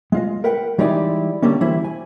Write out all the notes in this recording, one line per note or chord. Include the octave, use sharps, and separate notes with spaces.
G#3 F4 D#5
A#4 B4 F#5 G5
E3 G3 G#3 D#4 E4 D5
D3 G3 A#3 C#4
E3 G3 E4 C5
G#5